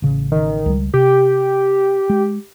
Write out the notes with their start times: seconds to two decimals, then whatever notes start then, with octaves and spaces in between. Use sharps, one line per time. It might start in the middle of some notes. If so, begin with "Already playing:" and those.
0.02 A1 C#3
0.32 D#3
0.66 C#2 G3
0.94 C3 G4
2.10 G#3